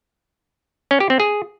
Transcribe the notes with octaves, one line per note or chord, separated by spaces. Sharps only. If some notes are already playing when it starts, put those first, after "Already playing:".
C#4
G4
C4
G#4